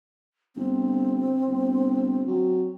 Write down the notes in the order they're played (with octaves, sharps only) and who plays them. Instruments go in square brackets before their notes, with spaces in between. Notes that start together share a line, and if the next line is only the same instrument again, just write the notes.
[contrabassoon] G1 [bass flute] C4
[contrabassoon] G1
F#3